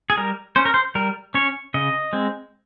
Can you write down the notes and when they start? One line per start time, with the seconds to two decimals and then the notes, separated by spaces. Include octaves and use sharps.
0.10 G#4
0.17 G3 A#4
0.56 C#4 C5
0.65 A#4
0.74 C5
0.95 G3 A#4
1.34 C#4 C#5
1.74 C#3 D#5
2.13 G#3 C4